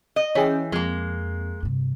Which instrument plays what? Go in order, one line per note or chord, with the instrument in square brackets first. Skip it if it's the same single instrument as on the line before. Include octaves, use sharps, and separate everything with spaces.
[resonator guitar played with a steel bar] D#5
[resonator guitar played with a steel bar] E3 [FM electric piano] C#4 G#4 G5
[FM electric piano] F2 [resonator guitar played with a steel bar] G#3 A#3
[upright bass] G2 C3